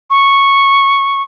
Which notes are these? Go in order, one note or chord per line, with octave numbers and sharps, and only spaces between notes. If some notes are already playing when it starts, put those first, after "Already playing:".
C#6